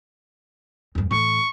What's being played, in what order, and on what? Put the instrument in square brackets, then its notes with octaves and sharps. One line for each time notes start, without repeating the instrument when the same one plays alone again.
[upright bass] E2 G2
[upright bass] A2 E3 [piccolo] C#6